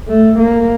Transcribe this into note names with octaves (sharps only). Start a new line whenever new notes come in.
A3
A#3